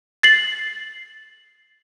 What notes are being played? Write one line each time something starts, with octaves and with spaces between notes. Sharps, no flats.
A6 C7 F#7